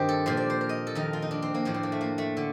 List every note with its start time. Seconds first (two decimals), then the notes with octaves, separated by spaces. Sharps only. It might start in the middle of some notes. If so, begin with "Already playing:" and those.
Already playing: G2 D#3 C4 G4
0.09 A4
0.26 A#2 F3 C5
0.37 D5
0.50 C5
0.61 A#4
0.69 D#5
0.87 A4
0.95 F2 D#3 A#4
1.13 F4
1.22 D#4
1.31 D4
1.42 C4
1.54 A#3
1.65 A2 F3 D4
1.74 C4
1.83 A#3
1.92 A3
2.01 A#3
2.18 A3
2.37 D3